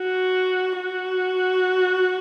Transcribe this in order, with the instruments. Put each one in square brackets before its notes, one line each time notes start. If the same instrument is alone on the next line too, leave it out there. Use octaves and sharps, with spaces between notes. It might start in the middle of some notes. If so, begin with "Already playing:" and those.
Already playing: [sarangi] F#4
F#4